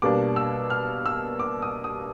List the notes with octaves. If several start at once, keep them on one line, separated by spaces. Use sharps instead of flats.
B2 G3 A#3 D4 D6
E6
F6
E6
D6
D#6
D#6